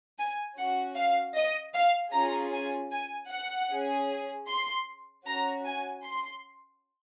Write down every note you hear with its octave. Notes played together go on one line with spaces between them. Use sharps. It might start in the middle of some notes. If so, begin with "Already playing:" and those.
G#5
C#4 F#4 F#5
F5
D#5
F5
C#4 F4 G#4 A#5
G#5
G#5
F#5
C#4 G#4
C6
C#4 F#4 A#5
G#5
C6